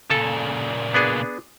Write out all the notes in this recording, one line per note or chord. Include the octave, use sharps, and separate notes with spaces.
A#2 C#3 A4 A5
B3 D4 G#4